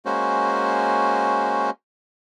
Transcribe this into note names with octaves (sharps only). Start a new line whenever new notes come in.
G#3 A#3 C#4 F#4 C5